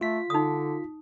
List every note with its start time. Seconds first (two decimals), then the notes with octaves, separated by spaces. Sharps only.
0.01 A3 F4 B6
0.30 D3 D#4 D#6